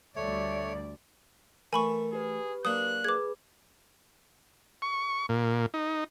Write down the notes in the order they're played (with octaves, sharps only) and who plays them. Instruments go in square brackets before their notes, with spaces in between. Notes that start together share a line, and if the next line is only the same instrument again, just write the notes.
[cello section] D2 G3 D5 [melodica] A3 C#5
[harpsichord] E3 A3 [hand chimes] A#4 [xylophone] G#5 B5 C#6
[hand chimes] G4 B4 [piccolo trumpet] G#4
[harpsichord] F#3 A#3 D4 [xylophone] D#6 [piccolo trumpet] F#6
[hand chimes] G#4 B4 [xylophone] D6 G#6
[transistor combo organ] C#6
A#2
D#4